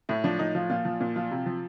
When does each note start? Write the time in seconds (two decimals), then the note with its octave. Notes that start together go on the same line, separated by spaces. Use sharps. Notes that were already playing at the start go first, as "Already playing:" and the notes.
0.09 A2 E4
0.24 F3 D4
0.39 A2 D#4
0.55 F3 F4
0.70 A#2 F4
0.85 F3
1.01 A#2
1.16 F3 F4
1.31 C3
1.46 F3